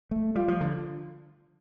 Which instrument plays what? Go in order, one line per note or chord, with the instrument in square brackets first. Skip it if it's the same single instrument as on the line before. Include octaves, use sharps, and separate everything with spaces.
[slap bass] A3
[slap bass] G3 [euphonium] F4
[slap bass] F3
D3